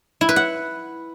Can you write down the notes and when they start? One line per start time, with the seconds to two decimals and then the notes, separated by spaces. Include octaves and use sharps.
0.21 E4
0.29 B4
0.36 F#5